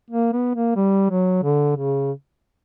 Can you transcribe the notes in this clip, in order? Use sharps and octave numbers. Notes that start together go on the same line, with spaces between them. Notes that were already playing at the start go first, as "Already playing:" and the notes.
A#3
B3
A#3
G3
F#3
D3
C#3